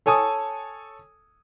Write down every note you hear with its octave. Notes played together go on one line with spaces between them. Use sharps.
A4 C#5 G#5 A5 D#6